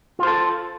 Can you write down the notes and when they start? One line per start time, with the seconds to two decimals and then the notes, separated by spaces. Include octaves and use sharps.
0.19 F4
0.23 C5
0.27 A4